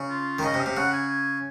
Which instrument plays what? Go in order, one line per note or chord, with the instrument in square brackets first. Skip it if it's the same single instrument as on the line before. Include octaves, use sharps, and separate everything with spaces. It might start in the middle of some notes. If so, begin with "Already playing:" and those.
Already playing: [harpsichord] C#3
[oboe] F4
[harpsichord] D#3
[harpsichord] C#3 [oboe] D#5
[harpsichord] C3
[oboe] F5
[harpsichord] C3
[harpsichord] C#3 [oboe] F#5
[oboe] G#5